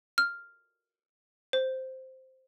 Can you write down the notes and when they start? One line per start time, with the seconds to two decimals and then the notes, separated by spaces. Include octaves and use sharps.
0.18 F6
1.53 C5